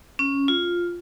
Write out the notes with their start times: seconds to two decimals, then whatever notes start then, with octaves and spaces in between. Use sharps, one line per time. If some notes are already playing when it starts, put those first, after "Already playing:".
0.19 C#4
0.48 F4